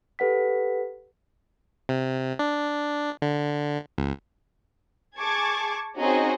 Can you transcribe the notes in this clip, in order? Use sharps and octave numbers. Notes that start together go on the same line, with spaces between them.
G4 A4 B4 F#5 B6
C3
D4
D3
C#2
G#4 A5 C#6 D6 G#6
C4 C#4 D#4 F#4 G#4 D#5